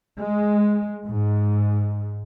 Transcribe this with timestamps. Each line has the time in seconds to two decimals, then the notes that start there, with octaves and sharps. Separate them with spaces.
0.19 G#3
1.07 G#2